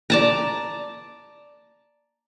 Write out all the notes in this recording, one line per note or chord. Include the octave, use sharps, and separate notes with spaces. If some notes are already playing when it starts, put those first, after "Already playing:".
D5 A5 A#5